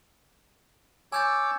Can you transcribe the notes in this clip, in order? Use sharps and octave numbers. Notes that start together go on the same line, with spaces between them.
C#5 G#5 D6 E6 G6 A6